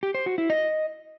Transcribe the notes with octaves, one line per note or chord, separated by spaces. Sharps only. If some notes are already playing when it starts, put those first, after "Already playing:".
G4
C5
F#4
E4
D#5